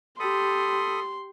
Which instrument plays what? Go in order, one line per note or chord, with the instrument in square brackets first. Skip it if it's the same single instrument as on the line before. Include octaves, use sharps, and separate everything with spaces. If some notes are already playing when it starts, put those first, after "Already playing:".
[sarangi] G4 [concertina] A4 B5 D#6 [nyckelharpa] C6